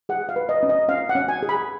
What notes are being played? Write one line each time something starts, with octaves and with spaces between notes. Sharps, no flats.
G#4 F#5
F5
B4
D#5
C#4
D#5
C#4 F5
F#5
C#4
G#5
G#4
B5